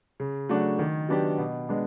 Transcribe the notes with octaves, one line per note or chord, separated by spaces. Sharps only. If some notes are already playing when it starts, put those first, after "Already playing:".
C#3
F#3 A3 D4 F#4
D#3
F#3 B3 D4 G4
B2
G#3 B3 D4